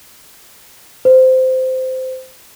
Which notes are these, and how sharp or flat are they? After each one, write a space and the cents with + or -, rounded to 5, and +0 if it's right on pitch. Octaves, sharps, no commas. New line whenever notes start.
C5 -15